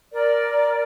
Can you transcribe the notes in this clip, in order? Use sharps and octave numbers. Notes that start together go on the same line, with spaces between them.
A#4 D5